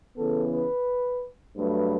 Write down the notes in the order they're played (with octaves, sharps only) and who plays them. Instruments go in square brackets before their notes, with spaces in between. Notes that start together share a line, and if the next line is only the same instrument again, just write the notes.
[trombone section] C#3 E3 B3 A4
B4
G2 F#3 A3 B4